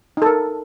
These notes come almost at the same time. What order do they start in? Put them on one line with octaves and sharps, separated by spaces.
D#4 A4 A#4